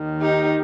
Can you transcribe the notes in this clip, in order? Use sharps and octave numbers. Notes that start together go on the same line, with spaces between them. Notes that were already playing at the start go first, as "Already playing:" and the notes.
Already playing: D#2 D#3
D#4 G4